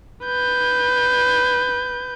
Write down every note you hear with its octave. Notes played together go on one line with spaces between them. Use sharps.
B4 G6